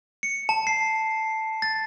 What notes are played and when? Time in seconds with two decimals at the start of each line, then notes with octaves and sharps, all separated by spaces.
0.23 C#7
0.49 A5
0.67 C7
1.62 A6